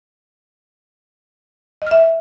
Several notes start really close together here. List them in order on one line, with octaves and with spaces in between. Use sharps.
D#5 F6 E5